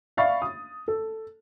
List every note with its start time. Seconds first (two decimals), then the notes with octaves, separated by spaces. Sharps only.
0.17 D5 E5 F5 B5 C#6 A6
0.42 D#6
0.88 A4